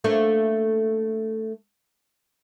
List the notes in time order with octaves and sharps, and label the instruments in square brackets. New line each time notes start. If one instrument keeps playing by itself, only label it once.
[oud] A3 A#3 D4